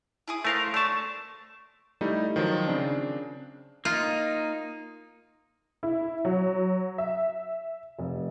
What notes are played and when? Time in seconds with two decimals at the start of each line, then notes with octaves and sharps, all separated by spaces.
0.27 E4 G#4 D#6
0.44 A3 E4 A#4 C5 F5 F#6
0.74 A3 D4 C#5 A5
2.01 G3 A3 D#4 E4
2.36 D#3 F3 F#3
2.68 C#3 C4 D4
3.85 A#3 D#4 F4
5.83 E4
6.25 F#3
6.98 E5
7.99 F1